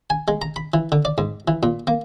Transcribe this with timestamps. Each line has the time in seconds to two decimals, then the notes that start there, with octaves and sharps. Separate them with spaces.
0.10 G#5
0.28 G#3
0.42 A#5
0.56 B5
0.74 E3
0.92 D3
1.05 D5
1.18 G#2
1.48 E3
1.63 A#2
1.87 A#3